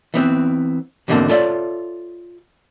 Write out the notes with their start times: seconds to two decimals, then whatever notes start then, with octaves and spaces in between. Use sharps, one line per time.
0.14 E3 B3 C4
1.08 E2 G#2 B2 D3 A#3 C4
1.29 F4 A4 C#5 D5 E5